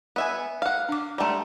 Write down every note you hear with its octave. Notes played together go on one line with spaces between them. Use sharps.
B3 E5 G#5
F5 F#5
D4 D6
G3 A3 F#5 A#5 C6